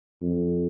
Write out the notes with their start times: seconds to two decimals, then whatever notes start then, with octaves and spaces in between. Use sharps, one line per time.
0.22 F2